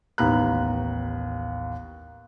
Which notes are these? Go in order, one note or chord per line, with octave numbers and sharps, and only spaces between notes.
A1 D#2 B3 A#5 B5 F#6